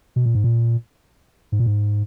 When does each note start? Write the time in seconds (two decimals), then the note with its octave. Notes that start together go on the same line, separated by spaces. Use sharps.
0.16 B2
0.26 A#2
0.35 G#2
0.44 A#2
1.52 G#2
1.60 A#2
1.66 G#2